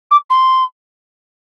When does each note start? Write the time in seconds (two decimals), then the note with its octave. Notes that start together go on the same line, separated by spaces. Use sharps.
0.11 D6
0.30 C6